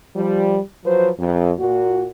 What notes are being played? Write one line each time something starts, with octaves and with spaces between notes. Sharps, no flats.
F3 G3
F3 F#3 B4 C5
F2
A#2 F#4